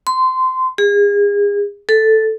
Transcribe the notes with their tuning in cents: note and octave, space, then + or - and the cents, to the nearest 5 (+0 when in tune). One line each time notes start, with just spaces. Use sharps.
C6 -20
G#4 -35
A4 +0